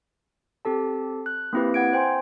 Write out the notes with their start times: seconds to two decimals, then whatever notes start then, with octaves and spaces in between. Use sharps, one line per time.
0.65 C4 G4 A4 A5
1.26 F#6
1.53 A#3 C4 E4 G4 B4
1.74 F#5 G#6 D7
1.93 C5 G5 G#5 C6